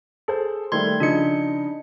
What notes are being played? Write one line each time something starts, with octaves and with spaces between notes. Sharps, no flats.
G#4 A4 C5
D#3 G3 A3 C6 G#6
C#3 F3 D4 D#4 C#7